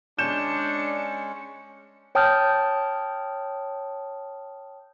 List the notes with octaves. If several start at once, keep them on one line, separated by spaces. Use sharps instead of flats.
G#3 C#4 D4 G6 C#7 E7
C#5 G5 A5 D#6 F6 G6